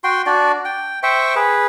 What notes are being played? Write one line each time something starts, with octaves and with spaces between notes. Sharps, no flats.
F#4 G5 C6
D4 F#4 D5
G5
C5 E5 G5 C#6
G#4 B4